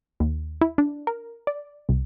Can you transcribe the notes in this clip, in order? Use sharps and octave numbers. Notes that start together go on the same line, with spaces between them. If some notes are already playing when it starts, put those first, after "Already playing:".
D#2
E4
D4
A#4
D5
C2